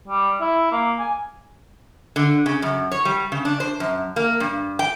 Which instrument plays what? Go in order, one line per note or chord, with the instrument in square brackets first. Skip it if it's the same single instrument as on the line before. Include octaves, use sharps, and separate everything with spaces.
[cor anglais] G3
E4
A#3
G#5
[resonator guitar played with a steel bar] D3
C#3
F#2
C#5
G3
C#3
D4
C5
F#2
A#3
G2
G5